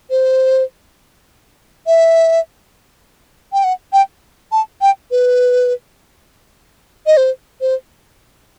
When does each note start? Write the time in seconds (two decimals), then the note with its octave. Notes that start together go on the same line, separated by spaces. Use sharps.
0.10 C5
1.87 E5
3.53 G5
3.64 F#5
3.93 G5
4.52 A5
4.81 G5
5.11 B4
7.06 D#5
7.17 C5
7.61 C5